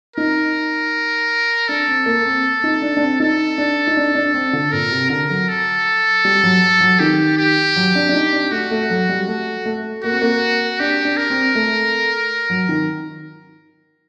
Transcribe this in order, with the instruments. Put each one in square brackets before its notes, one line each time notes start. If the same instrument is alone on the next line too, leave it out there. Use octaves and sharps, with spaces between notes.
[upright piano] D#4 [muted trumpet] A#4
[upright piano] D4 [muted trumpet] A4
[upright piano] C4
A#3
C4
D#4
D4
D4
C4
[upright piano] D#4 [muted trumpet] A4
[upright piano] D4
D#4
D4
D4
C4
D3
[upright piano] A#2 [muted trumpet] A#4
[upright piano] C3
[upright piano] D3 [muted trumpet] A#4
[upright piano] F#3
[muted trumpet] A4
[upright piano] G3
F#3
F#3
[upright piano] D#3 [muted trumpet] G4
[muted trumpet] G4
[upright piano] F#3
D4
D4
D#4
D4
[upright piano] A3 [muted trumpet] F#4
[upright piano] A3
F#3
G3
A3
A3
[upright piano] A#3 [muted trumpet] F#4
[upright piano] C4
A#3
[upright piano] D4 [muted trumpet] G4
[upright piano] D4
[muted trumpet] A#4
[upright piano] C4
A3
F#3
D#3